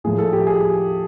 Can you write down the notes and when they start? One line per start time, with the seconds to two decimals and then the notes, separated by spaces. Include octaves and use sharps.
0.04 A2 F3 G#4
0.18 A4
0.33 G4
0.47 G#4